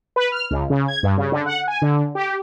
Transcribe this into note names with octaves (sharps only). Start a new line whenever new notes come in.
B4
F6
C#2
C#3
G#6
G2
C#3
D3
F#5
G#5
D3
G4